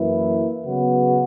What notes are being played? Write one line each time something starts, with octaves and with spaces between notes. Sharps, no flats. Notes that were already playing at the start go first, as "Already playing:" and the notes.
Already playing: F#2 E3 A#3 E4 B4
C#3 F#3 B3 F#4 B4